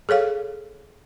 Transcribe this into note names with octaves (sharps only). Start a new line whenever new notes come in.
G#4 A4 C#5 F5